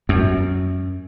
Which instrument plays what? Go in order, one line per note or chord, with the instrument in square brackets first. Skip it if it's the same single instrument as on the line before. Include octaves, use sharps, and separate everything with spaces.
[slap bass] F#2